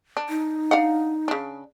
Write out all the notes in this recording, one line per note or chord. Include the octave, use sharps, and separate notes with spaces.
D4
D#4
D4 F5 F#5
C#3 D4